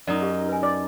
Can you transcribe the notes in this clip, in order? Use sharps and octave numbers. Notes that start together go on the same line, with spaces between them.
F#2 D#4 D5 D#5
G4 F5
B4 G#5
D5